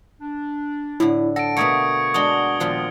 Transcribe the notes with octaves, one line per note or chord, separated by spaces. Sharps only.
D4
A2 D3 E4
A4 F#5 A#6 D7
B2 A3 A#3 C#6 D#6 G#6 C#7
G#3 D4 F#4 D#6 G7
A#2 D#3 F3 G#3 B3 F4